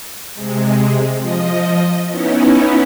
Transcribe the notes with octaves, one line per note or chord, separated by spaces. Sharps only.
C3 G#3
F3 D#5
B3 C#4 D#4 E4